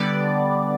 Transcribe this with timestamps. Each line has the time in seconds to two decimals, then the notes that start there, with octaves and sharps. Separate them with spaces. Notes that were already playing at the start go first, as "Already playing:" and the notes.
Already playing: D3 G3 B3 D5